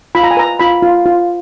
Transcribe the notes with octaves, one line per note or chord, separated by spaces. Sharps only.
F4 B5
A#5
G#5
B4 A#5
F4 B5
F4
F4